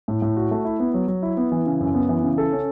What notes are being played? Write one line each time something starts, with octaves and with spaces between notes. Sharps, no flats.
A2
A2
F#4
A3
E4
B3
F#3
F#3
E4
B3
E3
C#3
F#2
B3
E3
C#3
A4
C#4